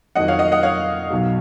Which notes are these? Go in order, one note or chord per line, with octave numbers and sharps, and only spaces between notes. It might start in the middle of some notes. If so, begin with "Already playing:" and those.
F2 D#3 F#3 D#5 F#5
C#5 F5
D#5 F#5
D#5 F#5
C#5 F5
B1 B2 F#3